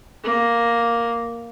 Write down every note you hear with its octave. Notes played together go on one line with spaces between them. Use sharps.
A#3